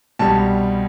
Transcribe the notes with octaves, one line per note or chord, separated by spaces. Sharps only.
C2 B2 G3 A5